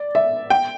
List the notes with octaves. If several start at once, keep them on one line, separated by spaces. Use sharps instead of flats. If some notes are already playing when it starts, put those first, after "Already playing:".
Already playing: D5
E5
G5